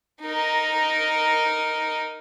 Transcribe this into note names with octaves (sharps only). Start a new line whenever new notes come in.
D#4 A#4